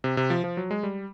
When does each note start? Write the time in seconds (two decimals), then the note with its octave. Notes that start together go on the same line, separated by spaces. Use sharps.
0.04 C3
0.17 C3
0.30 F3
0.44 F3
0.57 F#3
0.71 G#3
0.83 G3